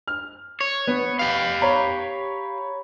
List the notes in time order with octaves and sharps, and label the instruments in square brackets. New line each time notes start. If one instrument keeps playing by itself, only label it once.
[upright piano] F6
[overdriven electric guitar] C#5
[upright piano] B3 B4
[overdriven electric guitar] G4 F5
[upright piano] C#5 A#5 B5